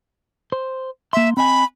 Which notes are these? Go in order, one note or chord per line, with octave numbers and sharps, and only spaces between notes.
C5
A#3 E5 C6
C4 D#5 G#5 B5